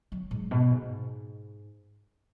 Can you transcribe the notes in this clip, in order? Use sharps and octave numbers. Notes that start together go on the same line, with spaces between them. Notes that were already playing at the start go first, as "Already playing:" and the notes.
F#3
G#2
B2
G#2